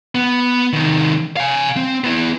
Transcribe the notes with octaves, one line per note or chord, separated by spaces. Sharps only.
B3
C3 D#3
F5 G#5
C4
B3 E4